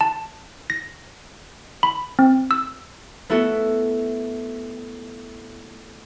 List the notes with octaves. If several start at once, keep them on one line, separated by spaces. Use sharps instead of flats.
A5
A#6
B5
C4
E6
A3 B3 E4 F#4 A4